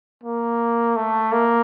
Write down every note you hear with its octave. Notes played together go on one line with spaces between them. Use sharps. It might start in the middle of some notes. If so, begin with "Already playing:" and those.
A#3
A3
A#3